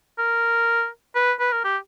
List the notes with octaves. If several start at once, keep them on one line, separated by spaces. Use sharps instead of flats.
A#4
B4
B4
A#4
G4